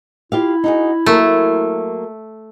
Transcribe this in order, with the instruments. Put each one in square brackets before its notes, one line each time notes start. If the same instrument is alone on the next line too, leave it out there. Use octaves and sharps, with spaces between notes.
[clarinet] E4 [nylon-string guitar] F4 G4 F5
[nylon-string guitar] D#4 F#4 G#4
[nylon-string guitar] F#3 A#3 A#4 [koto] A3